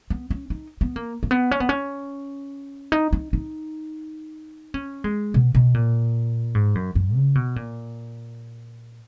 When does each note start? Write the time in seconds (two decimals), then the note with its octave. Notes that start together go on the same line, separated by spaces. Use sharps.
0.10 B3
0.30 C#4
0.50 D#4
0.81 B3
0.96 A#3
1.23 A#3
1.31 B3
1.51 C#4
1.60 B3
1.69 C#4
2.92 D#4
3.13 D#4
3.33 D#4
4.74 C#4
5.04 G#3
5.34 B2
5.55 B2
5.74 A#2
6.55 G#2
6.75 F#2
6.95 F#2
7.15 C#3
7.35 B2
7.56 A#2